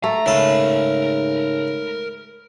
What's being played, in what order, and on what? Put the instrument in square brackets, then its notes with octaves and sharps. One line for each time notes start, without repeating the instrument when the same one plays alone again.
[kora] A3 [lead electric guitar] A#5
[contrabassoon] G#2 [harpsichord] C#3 A4 [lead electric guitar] A#4 B5